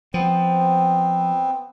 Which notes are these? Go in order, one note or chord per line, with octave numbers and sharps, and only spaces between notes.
F3 B3 C4